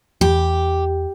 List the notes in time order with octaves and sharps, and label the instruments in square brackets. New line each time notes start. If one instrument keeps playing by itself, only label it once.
[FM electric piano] E2 [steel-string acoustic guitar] G4